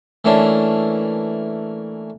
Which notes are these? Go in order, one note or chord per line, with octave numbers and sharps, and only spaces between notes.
E3 A3 A#3 C#4 D4